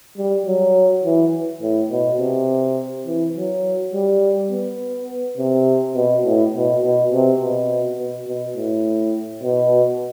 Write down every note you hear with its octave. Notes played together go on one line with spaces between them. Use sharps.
G3
F#3
E3
A2
B2
C3
E3
F#3
G3
B3
C3
B2
A2
B2
B2
C3
B2
B2
B2
A2
B2